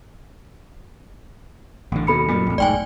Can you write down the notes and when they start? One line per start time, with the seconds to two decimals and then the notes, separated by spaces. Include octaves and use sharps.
1.92 A1 D3
2.07 D#2 B2 A4 B5 C#7
2.29 F#2 A#2 A3
2.47 A#1 F2
2.58 E1 B1 G#2 D5 G5 G#5